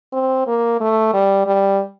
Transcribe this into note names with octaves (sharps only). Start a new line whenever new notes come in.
C4
A#3
A3
G3
G3